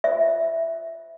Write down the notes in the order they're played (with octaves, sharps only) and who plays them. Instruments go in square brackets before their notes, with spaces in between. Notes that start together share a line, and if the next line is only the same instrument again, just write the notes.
[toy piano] F4 C5 E5